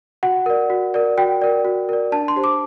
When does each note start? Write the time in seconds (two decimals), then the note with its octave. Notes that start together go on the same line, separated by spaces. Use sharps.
0.23 F#4 F#5
0.46 A#4 D5
0.70 F#4
0.94 A#4 D5
1.18 F#4 G5
1.42 A#4 D5
1.65 F#4
1.89 A#4 D5
2.12 D4 A5
2.28 C6
2.36 G4 C5
2.44 D6